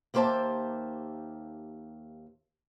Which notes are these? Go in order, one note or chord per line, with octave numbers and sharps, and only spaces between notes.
D#2 A#3 G4 C5 E5 A5